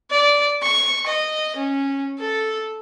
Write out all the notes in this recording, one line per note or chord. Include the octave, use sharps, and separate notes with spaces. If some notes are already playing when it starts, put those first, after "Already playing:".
D5
C#6
D#5
C#4
A4